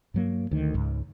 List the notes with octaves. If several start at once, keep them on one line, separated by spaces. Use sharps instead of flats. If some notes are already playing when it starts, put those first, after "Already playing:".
G2 F#3 A#3
D2 D#3
C#2 G#2